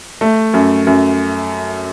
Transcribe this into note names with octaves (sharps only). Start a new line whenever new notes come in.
A3
F#2
F#2